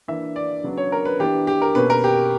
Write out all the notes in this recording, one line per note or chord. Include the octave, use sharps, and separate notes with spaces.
E3 A#3 D4 E5
D5
C#3 F#3 B3 D4
C#5
A#4
B4
E3 B3 D4 G4
G4
A#4
B2 A#3 C#4 B4
A#4
G4